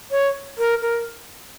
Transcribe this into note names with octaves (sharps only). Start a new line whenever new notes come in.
C#5
A#4
A#4